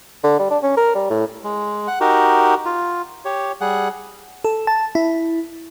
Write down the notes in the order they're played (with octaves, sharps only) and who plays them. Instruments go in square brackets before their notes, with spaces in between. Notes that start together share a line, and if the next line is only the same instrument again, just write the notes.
[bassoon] D3
G3
D4
C#4
A#4
G3
A2
[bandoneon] G#3
F#5
D#4 F#4 G4 A#4
F4
G4 C#5
G3 G#4 F#5
[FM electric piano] A4
A5
E4